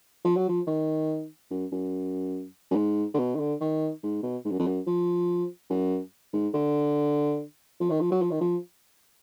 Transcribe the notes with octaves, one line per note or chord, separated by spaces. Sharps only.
F3
F#3
F3
D#3
F#2
F#2
F#2
G#2
D3
B2
D#3
D3
D#3
G#2
B2
G#2
F#2
F2
F#2
F3
F#2
G#2
D3
F3
D#3
F3
F#3
F3
D#3
F3